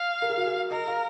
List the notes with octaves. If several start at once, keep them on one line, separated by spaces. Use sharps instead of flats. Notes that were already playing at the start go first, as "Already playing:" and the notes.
Already playing: F5
A#4
G#4
F#4
G#4
A#4 D#5
F5